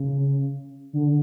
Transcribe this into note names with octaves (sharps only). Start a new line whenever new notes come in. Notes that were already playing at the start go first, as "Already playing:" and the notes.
Already playing: C#3
D3